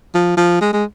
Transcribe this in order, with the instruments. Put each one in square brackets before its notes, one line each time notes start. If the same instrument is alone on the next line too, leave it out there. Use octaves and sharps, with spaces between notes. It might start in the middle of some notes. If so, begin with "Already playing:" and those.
[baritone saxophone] F3
F3
G#3
G#3